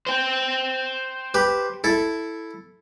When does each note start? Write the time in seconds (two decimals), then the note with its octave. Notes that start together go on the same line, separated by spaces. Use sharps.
0.07 C5 G5
1.34 G4 B4
1.84 E4 A4